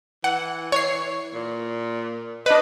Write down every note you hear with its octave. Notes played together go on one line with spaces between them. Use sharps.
E3 F#5
C#5 C7
A#2
D4 B4 D#5